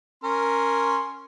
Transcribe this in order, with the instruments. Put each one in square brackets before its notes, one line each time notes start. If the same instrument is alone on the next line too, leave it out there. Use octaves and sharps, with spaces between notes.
[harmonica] C#4 A#4 C6